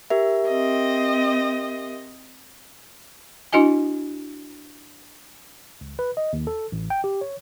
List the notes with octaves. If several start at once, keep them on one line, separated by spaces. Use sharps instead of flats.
G4 A#4 E5
C4 D#5
D4 E4 F#4 D#5 G#5
C#2
B4
D#5
D#2
A4
A1
G5
G4
C#5